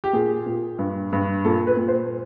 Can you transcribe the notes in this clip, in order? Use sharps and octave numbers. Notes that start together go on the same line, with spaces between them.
G4
A#2 G#4
A#2
G2
G2
A#2 A4
B4
A#2
C5